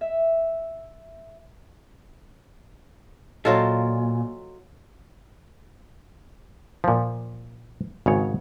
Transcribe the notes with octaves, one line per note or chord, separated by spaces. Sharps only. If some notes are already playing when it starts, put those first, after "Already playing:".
E5
A#2 F#3 F4 A4 C#5 D#5 F5
A#2 F3
G#1 C#3 C#5